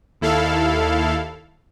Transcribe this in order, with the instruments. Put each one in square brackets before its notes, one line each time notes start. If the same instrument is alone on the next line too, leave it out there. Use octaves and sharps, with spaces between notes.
[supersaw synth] D#2 E4 A4 F5